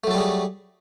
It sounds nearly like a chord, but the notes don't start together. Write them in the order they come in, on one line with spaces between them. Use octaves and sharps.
A3 F#3 A4 G3 G#4